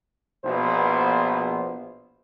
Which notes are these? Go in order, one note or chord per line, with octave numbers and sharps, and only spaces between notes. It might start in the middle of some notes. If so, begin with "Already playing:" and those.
A#1 B2 B3 F4 C5